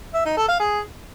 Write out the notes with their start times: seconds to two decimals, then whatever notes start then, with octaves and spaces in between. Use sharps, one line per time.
0.14 E5
0.26 D#4
0.37 A4
0.48 F5
0.60 G#4